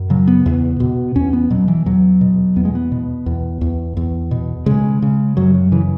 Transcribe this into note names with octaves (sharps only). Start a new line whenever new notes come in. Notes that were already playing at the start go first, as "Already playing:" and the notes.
Already playing: F#2
C#3 F#3
B3
E2
B2
E2 C#4
B3
B2 F#3
E3
E2 F#3
B2
E2 B3
G#3
B3
B2
E2
E2
E2
B2
C#3 G#3
C#3
F#2 F#3
F#3
C#3 E3